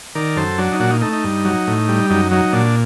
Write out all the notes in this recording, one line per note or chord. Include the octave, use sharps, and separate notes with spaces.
D#3 A#4 D5
F#2 A4 C5
F#3 D4
D#4
A#2 D4 F#4
D#4
A3 D#4
D#4
G2
F#3
A2
G3
F#2 D#4
F#3 D#4
A#2 D4